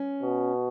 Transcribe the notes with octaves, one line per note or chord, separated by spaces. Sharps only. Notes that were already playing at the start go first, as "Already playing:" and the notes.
Already playing: C#4
B2